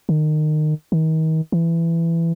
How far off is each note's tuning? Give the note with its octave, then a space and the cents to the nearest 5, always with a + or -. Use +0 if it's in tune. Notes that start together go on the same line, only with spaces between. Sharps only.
D#3 -25
D#3 +35
E3 +15